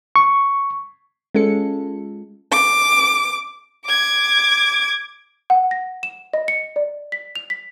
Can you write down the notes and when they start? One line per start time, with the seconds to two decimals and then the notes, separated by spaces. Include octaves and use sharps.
0.16 C#6
1.35 G#3 C#4 F4 A4 C#7
2.51 D6
3.85 D6 G#6
5.50 F#5
5.71 A#6
6.03 E7
6.34 D#5
6.48 C#7
6.76 D5
7.12 B6
7.36 F7
7.50 B6